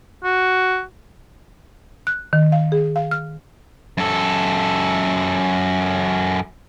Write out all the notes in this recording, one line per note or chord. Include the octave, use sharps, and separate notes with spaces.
F#4
F#6
D#3
F5
G#4
F5
F6
F#2 A4